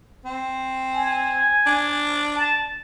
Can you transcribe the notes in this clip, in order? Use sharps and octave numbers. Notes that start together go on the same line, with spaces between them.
C4
G#5
D4
A5